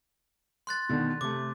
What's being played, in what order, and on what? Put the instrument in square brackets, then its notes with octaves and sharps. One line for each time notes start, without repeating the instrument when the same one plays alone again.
[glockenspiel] C6 F#6 A6
[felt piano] B2 D3 D#3
[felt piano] C3 A3 [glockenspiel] D6